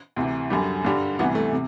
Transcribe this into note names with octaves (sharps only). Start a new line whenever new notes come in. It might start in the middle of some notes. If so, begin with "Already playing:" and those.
D2 C3 E3
F#2 D3 G3
G2 D3 G3
D2 C3 E3 G3 B3
A3
C3